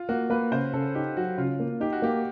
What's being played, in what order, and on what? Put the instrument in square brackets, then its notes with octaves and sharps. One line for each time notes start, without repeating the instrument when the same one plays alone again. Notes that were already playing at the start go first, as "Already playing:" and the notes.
Already playing: [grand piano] F4
[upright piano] A#3 [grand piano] F#4
[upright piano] A#3 [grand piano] B4
[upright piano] C#3 [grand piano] C5
[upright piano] C#3 [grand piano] A4
[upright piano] D#4 [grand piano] G4
[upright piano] F#3 [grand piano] F#4
[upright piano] C#3 [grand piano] F4
[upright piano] A#3
[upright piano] D#4 [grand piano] G4
[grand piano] F#4
[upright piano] A#3 [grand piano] G4